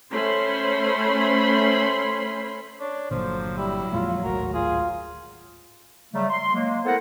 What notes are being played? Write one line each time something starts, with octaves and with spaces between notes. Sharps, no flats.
A3 C#4 C5 B5 C6
D4 C#5
G1 A#2 D3 F3 F#3 C5
G3 E4
F2 A#2 G#3 F4
D1 G#1 A3 F#4 A#4
F4 G#4
C#3 F#3 G3 A3
C6
F#3 G#3 A#3
B3 E4 A4 A#4 C5 F#5